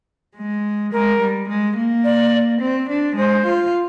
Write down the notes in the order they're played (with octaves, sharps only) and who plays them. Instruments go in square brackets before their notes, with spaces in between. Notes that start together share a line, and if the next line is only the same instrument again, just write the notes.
[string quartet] G#3
[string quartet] G#3 [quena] A#4
[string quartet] G3
G#3
A#3
[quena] D5
[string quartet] C4
D4
[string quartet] G#3 [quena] C5
[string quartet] F4